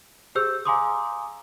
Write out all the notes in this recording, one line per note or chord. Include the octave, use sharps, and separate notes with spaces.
G4 G#4 C5 E6 G6
F5 G#5 A#5 C6 D6 D#6